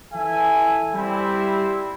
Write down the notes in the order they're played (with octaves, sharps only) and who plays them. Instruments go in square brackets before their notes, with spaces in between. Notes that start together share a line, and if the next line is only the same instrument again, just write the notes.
[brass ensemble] E3 A4 E5 G#5
G3 C4 E4